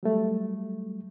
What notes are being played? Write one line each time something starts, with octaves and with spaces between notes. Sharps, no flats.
F#3 G3 A3